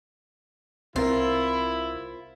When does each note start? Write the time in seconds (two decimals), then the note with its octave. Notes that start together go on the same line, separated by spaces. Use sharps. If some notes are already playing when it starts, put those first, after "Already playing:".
0.96 C2 C4 E4 F4 A#4